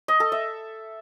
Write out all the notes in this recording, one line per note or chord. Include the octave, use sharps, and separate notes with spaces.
D#5
A4
E5